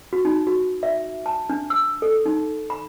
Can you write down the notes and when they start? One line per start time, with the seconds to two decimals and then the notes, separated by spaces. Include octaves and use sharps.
0.13 F#4
0.25 D#4
0.47 F#4
0.83 E5
1.26 A5
1.50 D4
1.70 E6
2.02 A4
2.26 D#4
2.70 B5